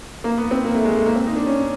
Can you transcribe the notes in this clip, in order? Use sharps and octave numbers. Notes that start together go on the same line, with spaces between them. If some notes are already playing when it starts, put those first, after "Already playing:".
A#3
B3
C4
A#3
A3
G#3
A3
A#3
C4
D#4
D4
C#4